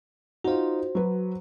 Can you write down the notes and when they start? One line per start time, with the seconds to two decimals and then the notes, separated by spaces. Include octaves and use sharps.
0.44 D#4 F4 F#4 C5
0.95 F#3 B4